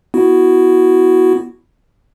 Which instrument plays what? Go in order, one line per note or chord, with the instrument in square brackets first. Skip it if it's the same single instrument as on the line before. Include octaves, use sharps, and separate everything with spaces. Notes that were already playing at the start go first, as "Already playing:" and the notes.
[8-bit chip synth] B3 E4 F#4